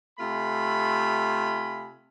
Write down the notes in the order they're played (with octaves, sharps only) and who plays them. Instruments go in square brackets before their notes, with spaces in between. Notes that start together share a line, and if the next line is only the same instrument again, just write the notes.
[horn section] C3 A3 F4 G#5 B5